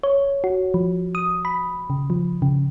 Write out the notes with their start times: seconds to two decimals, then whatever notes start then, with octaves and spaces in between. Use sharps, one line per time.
0.03 C#5
0.44 F#4
0.74 F3
1.15 D#6
1.45 B5
1.90 C#3
2.10 F3
2.42 C#3